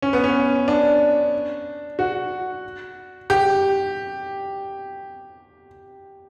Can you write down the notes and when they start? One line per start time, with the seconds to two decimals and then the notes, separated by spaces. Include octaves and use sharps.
0.02 C#4
0.13 B3
0.24 C#4
0.68 D4
1.99 F#4
3.30 G4